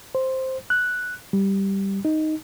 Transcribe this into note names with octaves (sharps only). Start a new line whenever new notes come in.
C5
F#6
G3
D#4